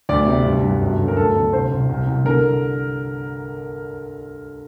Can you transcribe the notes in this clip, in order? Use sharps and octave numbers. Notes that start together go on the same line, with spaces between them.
D2 D5
C3
G2
G2
F#2
D3
A#4
D2 A4
D3
C2 C5
C2
C2
C2
D3 A#4